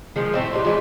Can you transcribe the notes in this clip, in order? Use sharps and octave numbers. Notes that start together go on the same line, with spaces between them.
D#3 F3 G#3
A2 C4 E4
D#4 G4 C5 D5 C6
E3 G#3 F4 G#4 B4 D#5